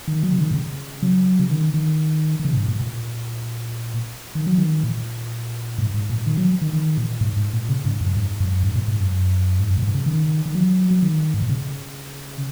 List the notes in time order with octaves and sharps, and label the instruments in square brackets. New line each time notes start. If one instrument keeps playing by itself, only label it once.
[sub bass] D#3
F#3
C#3
D#3
A#2
C#3
F#3
C#3
D#3
D#3
D#3
C#3
A#2
G#2
A#2
A#2
D#3
F#3
D#3
A#2
G#2
G#2
A#2
D#3
F#3
D#3
D#3
A#2
G#2
G#2
A#2
C#3
G#2
F#2
G#2
F#2
G#2
A#2
G#2
F#2
G#2
F#2
A#2
G#2
C#3
D#3
D#3
F#3
F#3
D#3
G#2
A#2
C#3